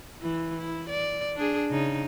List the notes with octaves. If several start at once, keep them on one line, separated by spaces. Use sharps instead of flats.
E3 E4
E4
D5
D4 G#4
C#3 D#4